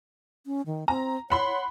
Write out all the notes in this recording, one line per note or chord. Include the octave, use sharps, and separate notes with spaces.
C#4
D#3
C4 A#5
C#5 F#5 B5 C6